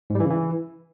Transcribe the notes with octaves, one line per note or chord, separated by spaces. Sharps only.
G#2
G3
E3
C#3
E3